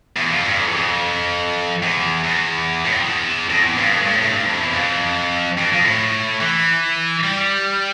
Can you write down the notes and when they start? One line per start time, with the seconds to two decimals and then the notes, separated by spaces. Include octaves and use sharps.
0.16 E2
0.31 F2
0.44 G2
0.58 F2
0.67 E2
0.76 F2
1.83 E2
2.24 E2
2.85 A2
2.92 G2
3.00 F2
3.07 E2
3.50 F2
3.62 E2
3.77 G2
3.91 F2
4.02 G2
4.11 A2
4.22 A2
4.32 G2
4.46 F2
4.60 E2
4.73 F2
5.58 F2
5.72 F2
5.85 A2
6.41 E3
7.24 G3